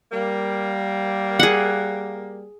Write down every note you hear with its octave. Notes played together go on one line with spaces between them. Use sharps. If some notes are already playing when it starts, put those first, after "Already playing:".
G3 A#3
G#4 F#5